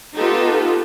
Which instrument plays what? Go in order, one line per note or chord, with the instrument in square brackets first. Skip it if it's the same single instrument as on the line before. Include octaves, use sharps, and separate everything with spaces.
[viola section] B3 D#4 F4 G4 A4